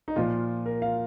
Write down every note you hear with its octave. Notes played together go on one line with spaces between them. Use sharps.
D#4
A#2 F3 F4
A#4
F5